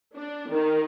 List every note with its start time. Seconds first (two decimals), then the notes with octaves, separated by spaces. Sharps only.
0.15 D4
0.50 D#3